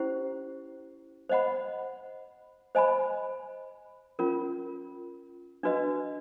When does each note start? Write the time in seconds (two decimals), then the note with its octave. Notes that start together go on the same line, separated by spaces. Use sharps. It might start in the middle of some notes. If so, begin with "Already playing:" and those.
Already playing: C#4 E4 G4 C5
1.29 C5 D#5 F#5 B5
2.75 C5 D#5 G#5 B5
4.19 C#4 F4 A#4
5.63 D4 F#4 B4 D#5